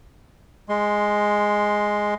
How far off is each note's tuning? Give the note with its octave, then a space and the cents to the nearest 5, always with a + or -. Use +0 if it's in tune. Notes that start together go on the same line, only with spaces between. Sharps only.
G#3 +0 C6 +0